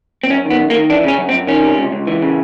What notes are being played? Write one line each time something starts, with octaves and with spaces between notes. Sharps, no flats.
C4
F#2 C#4
D#3
B3
F#2
A#3
D#3
E3 D4
C#3 C#4
F#2
C4
F#2
D#3 C#4
C3
C#2
C#2
E3
C#3